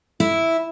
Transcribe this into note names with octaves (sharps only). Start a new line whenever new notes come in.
E4